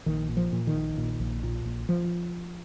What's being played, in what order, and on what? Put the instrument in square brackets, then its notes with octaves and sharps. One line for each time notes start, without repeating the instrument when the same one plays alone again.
[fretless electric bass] A#1 D#3
A#2
F3
A#2
D#3
A#1
A#2
A#1
A#2
A#1
F3